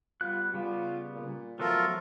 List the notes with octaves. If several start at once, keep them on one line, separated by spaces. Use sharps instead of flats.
G3 B3 F4 F#6
C#3 G3 B3 F4
A#2
F3 F#3 A3 B3 F4 A4 A#4